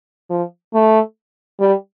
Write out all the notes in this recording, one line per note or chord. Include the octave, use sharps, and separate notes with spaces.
F3
A3
G3